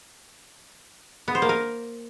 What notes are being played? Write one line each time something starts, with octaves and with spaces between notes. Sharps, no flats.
B3
C5
A#3
A#4